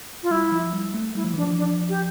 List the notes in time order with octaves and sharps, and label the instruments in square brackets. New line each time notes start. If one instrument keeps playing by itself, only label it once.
[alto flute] F4
[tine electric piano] G3 [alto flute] E4
[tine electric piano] F3
G3
A3
[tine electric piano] G3 [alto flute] E4
[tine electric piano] F3
[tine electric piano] E3 [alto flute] D4
[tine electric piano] F3
[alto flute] D4
G4